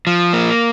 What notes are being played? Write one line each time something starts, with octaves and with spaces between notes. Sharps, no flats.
F3
A#3